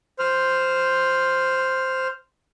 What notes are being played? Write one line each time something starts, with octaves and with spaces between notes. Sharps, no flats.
C5 F6